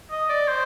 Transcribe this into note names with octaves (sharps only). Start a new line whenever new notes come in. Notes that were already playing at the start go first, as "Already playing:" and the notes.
D#5
D5
C5